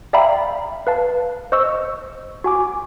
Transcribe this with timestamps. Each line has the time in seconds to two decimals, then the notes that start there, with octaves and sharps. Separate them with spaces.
0.13 D5 E5 F5 G5 A#5 B5
0.87 B4 F5 A5
1.52 C5 D#5 C#6 E6
2.44 F#4 G#5 D6